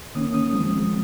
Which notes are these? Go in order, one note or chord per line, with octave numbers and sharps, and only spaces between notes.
D#3 A#3 C#4 D#6
D#6
F3 G#3 C4